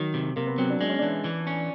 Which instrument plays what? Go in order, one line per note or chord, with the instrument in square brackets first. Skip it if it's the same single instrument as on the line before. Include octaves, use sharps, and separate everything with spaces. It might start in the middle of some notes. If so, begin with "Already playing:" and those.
Already playing: [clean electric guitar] D#3 [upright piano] F#3
[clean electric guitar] C3
[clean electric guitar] C3 [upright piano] A#3
[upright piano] B3
[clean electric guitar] F#3 [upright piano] C4
[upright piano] D4
[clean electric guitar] G#3 [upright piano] D4
[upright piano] C#4
[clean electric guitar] E3 [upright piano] D4
[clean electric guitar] E3
C#4